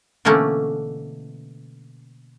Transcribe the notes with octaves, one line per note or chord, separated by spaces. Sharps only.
B2 D3 E3 A3 A#3 C#4